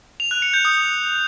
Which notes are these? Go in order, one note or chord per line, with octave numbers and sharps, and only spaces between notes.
F7
F#6
C#7
G6
D#6